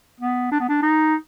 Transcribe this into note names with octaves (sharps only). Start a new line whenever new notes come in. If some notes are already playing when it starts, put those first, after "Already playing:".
B3
D4
B3
D4
D#4